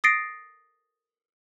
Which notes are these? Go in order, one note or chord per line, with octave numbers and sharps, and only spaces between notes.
D#6 A6 A#6 C7 D7